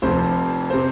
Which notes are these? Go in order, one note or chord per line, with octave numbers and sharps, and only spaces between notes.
F1 F2 C3 C5
C3 C5